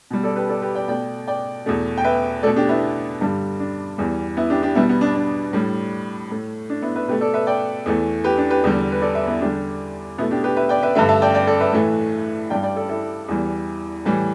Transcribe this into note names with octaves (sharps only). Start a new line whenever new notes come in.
B2 G3
A4 D5
G4 B4
A4 D5
G4 B4
D5 G5
B2 A3 D5 G5
D5 G5
E2 B2 A3
G5
B4 E5
B2 A3 A4 D5
D4 G4
B3 E4
G2 D3 G3
D4
E2 E3 G3
B3 E4
D4 G4
D4 G4
B2 G3 B3 E4
B3
D4
D4
A2 G3
A2 A3
D4
B3 E4
B4 E5
B2 A3 G4 B4
A4 D5
B4 E5
D5 G5
E2 E3 A3
G4 B4
D4
G4 B4
E2 D3 G3
B4
A4 D5
B4 E5
B3 E4
E2 D3 G3 D4 G4
B2 A3 B3 E4
D4 G4
G4 B4
B4 E5
D5 G5
B4 E5
G2 D3 A3 B4 E5
E5 A5
D5 G5
D5 G5
A4 D5
B4 E5
A2 E3 A3
G2 G3 D5 G5
D5 G5
A4 D5
E4 A4
E2 E3 G3
A2 E3 G3